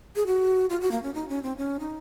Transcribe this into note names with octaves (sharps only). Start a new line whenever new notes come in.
G#4
F#4
F4
F#4
A#3
C#4
D#4
C#4
C4
C#4
D#4